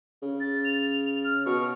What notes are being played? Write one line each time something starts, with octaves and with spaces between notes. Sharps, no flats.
C#3
A6
F7
F6
B2 C#6